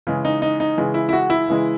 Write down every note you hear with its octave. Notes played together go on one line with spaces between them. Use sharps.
C#3 E3 G#3
D#4
D#4
D#4
C#3 E3 G#3
E4
E4
F#4
E4
C#3 E3 G#3